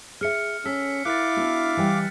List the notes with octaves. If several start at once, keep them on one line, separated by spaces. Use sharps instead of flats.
G#4 E5 F6 C#7
C#4 A4 E6 B6
E4 A#4 F5 D6 F#6 A6
B3 D4 F#4
E3 G3 G5